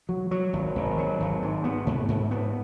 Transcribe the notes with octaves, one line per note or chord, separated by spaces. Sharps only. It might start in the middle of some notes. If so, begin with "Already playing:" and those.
F#3
F#3
G#1
G#1
F#3
G#1
G#2
B3
G#2
G#2
B3